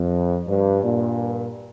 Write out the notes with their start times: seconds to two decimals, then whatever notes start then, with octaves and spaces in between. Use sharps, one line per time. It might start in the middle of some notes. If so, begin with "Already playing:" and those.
Already playing: F2
0.47 G2
0.84 G2 A#2